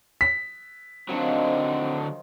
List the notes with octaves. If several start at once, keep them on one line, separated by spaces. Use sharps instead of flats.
B6
D3 D#3 F3 F#3 C4 D#4